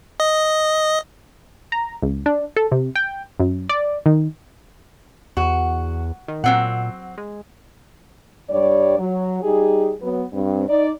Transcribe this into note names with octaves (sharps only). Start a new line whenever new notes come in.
D#5
A#5
C#2
D4
A4
C3
G5
F#2
D5
D#3
E2 F#4
D#3
A#2 F#3 C4 F#5
G#3
G2 G3 C#5 D5
F#3
G3 D#4 G4 G#4
F#3 B3
G2 C4
D#4 D5